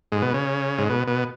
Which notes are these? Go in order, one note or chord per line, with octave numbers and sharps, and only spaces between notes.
G#2
B2
C#3
G#2
B2
B2